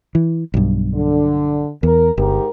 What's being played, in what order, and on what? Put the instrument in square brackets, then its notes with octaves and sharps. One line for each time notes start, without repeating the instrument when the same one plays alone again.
[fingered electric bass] E3
B1 G2
[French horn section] D3
[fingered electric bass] E2 [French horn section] A#4
[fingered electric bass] G1 [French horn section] G#2 G4 A#4